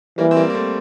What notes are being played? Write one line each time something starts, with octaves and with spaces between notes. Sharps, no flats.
E3 G3 A#3
C4
G3 A#3
A#3
A3 C4